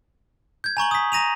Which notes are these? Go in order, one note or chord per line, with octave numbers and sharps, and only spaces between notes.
G6 G#6
G#5 A#5 C#6 F#7
D#6 B6
A#5 A#6 D#7 F7